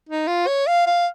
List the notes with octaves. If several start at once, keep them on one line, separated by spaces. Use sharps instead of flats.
D#4
F4
C#5
F5
F5